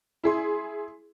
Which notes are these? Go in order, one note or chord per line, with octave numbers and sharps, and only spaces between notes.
E4 G#4 C6